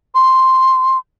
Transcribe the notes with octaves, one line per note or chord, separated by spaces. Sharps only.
C6